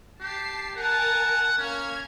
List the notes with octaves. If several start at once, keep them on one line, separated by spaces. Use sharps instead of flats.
G4 A5 C7
A#4 F#5 G#5 A5
A#3 C#4 F6 G#6